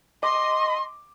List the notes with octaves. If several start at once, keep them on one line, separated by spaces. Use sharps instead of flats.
D#5 C6 D6